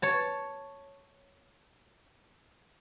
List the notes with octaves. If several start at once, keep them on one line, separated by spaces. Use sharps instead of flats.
C#5 A5